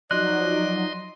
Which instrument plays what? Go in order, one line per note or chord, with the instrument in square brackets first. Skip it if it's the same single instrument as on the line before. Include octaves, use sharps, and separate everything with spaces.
[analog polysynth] F3 F#3 D#4 [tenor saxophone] D5 [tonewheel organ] D#5 C6 [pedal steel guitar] F#6